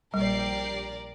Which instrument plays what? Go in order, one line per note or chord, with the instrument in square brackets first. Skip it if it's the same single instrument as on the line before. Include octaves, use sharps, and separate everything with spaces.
[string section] A#1 G4 C7 [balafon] G3 [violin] A#4 D5